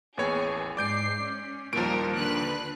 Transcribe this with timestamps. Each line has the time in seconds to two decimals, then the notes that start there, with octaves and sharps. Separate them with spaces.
0.17 A1 D#2 B3 G#4 C#5
0.77 G#2 D5 D6 G6 C7 D7
1.22 C#4
1.73 D#2 A#2 F3 G3 A#4 D7
2.15 D3 B4 F#6